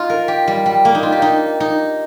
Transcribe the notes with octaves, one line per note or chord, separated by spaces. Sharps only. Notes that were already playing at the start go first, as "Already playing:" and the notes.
Already playing: D#4 F4
A#4
G4
G3
G3
A#3
D#4
F4
G4
D#4
D#4